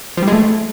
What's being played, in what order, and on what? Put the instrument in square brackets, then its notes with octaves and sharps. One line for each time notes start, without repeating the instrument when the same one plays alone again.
[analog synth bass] F3
G3
G#3
A3